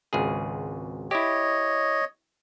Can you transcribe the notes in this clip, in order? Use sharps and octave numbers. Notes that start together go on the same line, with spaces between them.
G#1 C#2 G#4
E4 G4 C#5 D#5